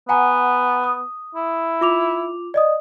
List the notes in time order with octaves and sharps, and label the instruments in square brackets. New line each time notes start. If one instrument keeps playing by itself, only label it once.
[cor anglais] B3 [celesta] F#5 G#5 A#5
[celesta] D#6
[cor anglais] E4
[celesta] F4 D6 F7
D5 D#5 D#6